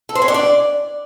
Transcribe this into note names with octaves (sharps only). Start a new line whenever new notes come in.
A4
C5
C#4
D4
D5